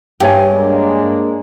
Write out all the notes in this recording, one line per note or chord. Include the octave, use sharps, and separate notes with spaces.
G2 G4 C#5 G#5
G#3 A#3 D4